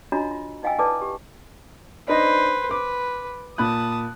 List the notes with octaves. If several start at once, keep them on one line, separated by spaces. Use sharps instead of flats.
D4 F4 F#4 C#5 D#5 A#5
F4
D#4 D#5 F5 G5 G#5 E6
E4 A4 B4 D5 A5 D6
G4
D4 D#4 B4 C5 D#5
B4 D6
A#2 A5 B5 D#6 F#6